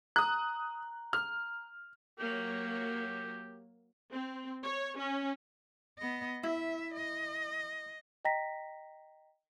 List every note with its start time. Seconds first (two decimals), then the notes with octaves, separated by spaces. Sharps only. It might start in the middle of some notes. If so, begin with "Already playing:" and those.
0.16 A#5 D#6 F#6
1.13 F6
2.20 F#3 A#3 G4
4.10 C4
4.63 C#5
4.98 C#4
5.98 B3 D#5
6.43 E4 E5
6.95 D#5
8.25 D#5 G5 A#5 A#6 B6